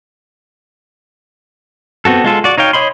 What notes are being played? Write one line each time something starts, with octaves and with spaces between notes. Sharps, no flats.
B3 C4 F#4 A4
G#3 F4 A4
F#4 D5
D#4 C#5 F5 G5
C#5 D#5 B5 C6